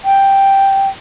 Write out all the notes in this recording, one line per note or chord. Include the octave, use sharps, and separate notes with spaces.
G5